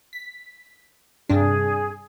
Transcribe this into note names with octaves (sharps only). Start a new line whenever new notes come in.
B6
G2 C3 D4 G#4